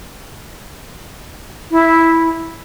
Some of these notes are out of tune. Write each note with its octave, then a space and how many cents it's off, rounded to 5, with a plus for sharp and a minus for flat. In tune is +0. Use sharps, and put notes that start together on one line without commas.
E4 -5